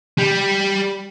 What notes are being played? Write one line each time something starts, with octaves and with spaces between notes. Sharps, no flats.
G3